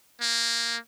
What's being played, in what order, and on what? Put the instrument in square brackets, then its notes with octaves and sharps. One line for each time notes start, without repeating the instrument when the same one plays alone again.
[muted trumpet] A#3